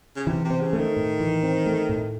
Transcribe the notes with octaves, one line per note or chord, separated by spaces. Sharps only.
C#3
C3 E3
C3
C4
C#3
A3
D#3
A2
E3
C4
A3
A2